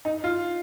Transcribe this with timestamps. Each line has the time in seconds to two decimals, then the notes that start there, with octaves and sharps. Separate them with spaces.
0.05 D#4
0.24 F4